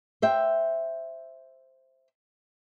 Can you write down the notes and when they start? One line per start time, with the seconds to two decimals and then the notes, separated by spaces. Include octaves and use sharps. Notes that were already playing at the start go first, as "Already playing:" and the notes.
0.22 C5 E5 G5